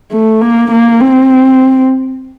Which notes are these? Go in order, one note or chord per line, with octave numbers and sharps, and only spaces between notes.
A3
A#3
A#3
C4